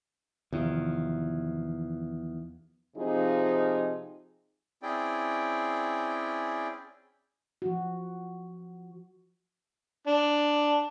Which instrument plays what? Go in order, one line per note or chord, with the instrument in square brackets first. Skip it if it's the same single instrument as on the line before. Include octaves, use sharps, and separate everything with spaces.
[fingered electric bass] E2 [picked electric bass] C3 D#3 F3
[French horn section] C3 F3 C4 D#4 F4 G#4
[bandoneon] C4 C#4 E4 G#4 D5 G5
[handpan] F3 F#4
[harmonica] D4